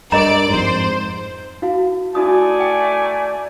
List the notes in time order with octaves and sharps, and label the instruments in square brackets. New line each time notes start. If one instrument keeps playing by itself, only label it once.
[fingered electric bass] G2 [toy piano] A#4 D#5 A#5 [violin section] D5 D7
[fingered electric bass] F2 G#2 [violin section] C5
[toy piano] E4 F#4 F5
[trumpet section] A3 D5 G#5 [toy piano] E4 F#4 D#6
[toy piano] G5
A#5